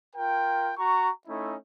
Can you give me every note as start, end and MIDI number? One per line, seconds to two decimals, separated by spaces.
0.16 0.72 65
0.16 0.72 70
0.16 0.72 79
0.78 1.10 66
0.78 1.10 82
0.78 1.10 85
1.27 1.55 57
1.27 1.55 61
1.27 1.55 63
1.27 1.55 64